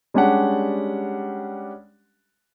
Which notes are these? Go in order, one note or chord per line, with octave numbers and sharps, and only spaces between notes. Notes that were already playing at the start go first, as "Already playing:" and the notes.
G3 G#3 C#4 D4 G4 F#5